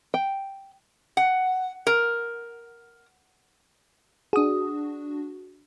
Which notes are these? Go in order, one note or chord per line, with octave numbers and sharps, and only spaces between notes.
G5
F#5
A#4
D4 F#4 G#4 D#6